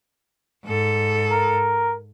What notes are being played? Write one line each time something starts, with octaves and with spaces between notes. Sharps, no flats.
G#2 A4
A#4